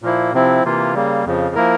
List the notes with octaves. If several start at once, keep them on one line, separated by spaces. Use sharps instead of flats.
A#2 F3 A#3 E4
C3 F3 C4 E4
C3 E3 A#3 F4
C#3 G3 A#3
F2 C#3 F3
F3 A#3 E4 A#4